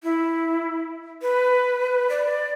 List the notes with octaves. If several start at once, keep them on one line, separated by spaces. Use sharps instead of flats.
E4
B4
D5